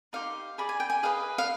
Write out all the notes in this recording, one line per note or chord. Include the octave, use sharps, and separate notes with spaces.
D#4 G4 C5 F5
G#4 D5 B5
G#5
G5
G#5
G#4 B4 D#5 F5
F5